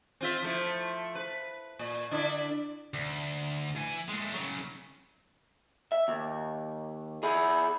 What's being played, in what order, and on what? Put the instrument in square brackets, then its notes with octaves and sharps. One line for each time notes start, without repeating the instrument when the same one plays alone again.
[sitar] C4 F4 E5
F3 A3 E4
B4
A#2
D3 D4 E4
[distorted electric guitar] D2
E3 G#5
G#3 A3
C#3 F#3
[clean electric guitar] E5
D#2
E4 G#4